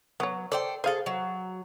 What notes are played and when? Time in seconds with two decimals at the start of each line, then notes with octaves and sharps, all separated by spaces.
0.20 F#3 B3 C#5
0.52 A4 C5 D5 G5
0.84 G#4 A4 C5 F5
1.06 F#3